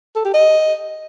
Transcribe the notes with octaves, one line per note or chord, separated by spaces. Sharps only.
A4
G4
D#5